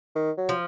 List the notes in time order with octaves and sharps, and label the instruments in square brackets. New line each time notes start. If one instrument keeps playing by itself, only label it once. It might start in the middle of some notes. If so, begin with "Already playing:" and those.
[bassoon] D#3
F#3
[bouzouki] F3